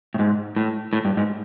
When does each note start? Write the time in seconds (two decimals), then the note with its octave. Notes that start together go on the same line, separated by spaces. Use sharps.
0.14 A2
0.19 G#2
0.56 A2
0.93 A2
1.05 G2
1.17 G#2